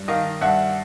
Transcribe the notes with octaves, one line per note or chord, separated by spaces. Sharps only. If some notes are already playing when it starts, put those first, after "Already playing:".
Already playing: G2
D#3 D#5 F5
G2 E5 F#5